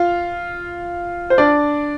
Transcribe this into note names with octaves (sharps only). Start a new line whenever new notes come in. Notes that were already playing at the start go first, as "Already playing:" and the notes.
Already playing: F4 F5
C5
D4 D5